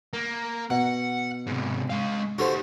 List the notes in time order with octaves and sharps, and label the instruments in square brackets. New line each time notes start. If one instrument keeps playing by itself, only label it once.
[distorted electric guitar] A#3
[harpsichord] B2 [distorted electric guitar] F#5
[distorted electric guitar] G#2 C3
G#3 F5
[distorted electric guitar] D#4 G4 [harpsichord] F#4 A4 C5